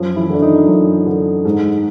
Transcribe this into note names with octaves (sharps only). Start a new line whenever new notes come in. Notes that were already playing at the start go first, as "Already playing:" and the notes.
Already playing: F#2 F3 F4
E3 E4
D3 D4
D#3 D#4
F#2
D3
G#2